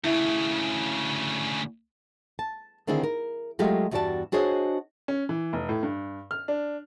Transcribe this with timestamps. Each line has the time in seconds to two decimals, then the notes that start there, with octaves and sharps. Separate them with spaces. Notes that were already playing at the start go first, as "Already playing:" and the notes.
0.05 D2 C#3 E4
2.39 A5
2.87 D3 D#3 C4 D4 E4 G#4
3.03 A#4
3.59 F#3 G#3 A3 F4 G4 F5
3.91 E2 G2 G3 F#4 D5 A5
4.32 D4 F#4 G#4 C5 C#5 D#5
5.08 C#4
5.29 E3
5.53 F1
5.69 A2
5.83 G2
6.31 F6
6.48 D4